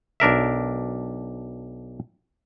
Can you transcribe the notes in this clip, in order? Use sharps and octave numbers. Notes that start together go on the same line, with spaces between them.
B1 D4 A#4 E5